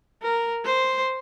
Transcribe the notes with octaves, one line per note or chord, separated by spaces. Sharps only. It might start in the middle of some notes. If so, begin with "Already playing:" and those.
A#4
C5